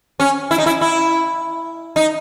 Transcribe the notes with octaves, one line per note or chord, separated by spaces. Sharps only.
C#4
E4
D#4
E4
E4
D#4